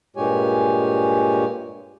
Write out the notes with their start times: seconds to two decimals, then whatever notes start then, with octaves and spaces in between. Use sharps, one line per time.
0.16 G2 A#2 G#3 G4 C#5 G#5